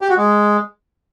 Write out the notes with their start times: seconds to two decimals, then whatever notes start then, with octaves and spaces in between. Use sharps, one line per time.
0.01 G4
0.09 F#4
0.17 G#3